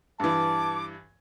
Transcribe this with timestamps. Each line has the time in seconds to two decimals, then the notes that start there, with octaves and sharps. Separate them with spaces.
0.20 G2 E3 A5 D6